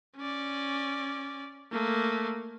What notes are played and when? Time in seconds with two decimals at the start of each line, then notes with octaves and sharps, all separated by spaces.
0.17 C#4 D5
1.72 A3 A#3